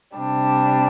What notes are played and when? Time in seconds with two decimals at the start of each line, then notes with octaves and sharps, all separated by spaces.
0.16 C3 G3 D4